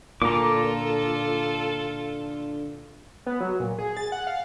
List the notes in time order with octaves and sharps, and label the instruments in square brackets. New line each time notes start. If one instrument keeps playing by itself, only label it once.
[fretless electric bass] A#2 [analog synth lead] D3 [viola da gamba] F4 A4 [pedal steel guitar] A#5 D6
[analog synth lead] B3
F#3
A#2
G#4
A6
F#5
F5